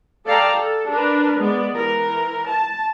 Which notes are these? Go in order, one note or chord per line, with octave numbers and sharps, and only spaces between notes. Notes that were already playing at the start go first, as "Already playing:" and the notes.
A4 D5 F5 G5 A5 A#5
A4
D4 A#4 B4
G#3 B3 D5
E3 A#4
A5